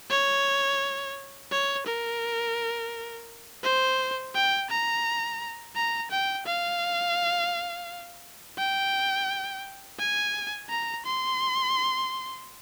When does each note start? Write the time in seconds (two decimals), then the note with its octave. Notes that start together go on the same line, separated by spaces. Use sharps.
0.10 C#5
1.51 C#5
1.87 A#4
3.64 C5
4.34 G5
4.70 A#5
5.76 A#5
6.11 G5
6.46 F5
8.58 G5
9.99 G#5
10.70 A#5
11.06 C6